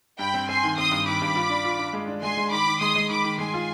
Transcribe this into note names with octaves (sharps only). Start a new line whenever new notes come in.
G2 G5 B5
C4
C4 G#5 C6
D#3
C4 C6 D#6
G2
D#3 B5 D6
G2
F4
D4
F4
D4
G#3
D4
G#3 G#5 C6
G#3
D#3 B5 D6
D#3
G#3 C6 D#6
G#3
D#3 B5 D6
D#3
G#3 G#5 C6
F4